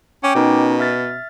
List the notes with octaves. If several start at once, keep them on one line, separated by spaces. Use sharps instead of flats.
C#4 G5 D6
B2 C#4 D#4 A#4
E5 F6 A6